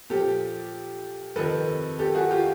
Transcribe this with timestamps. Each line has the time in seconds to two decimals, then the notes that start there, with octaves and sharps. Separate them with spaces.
0.10 A#2 F3 G4 A4
1.36 F2 C3 D#3 A4 B4
1.99 G4 A4
2.15 F#4 G#4
2.31 F4 G4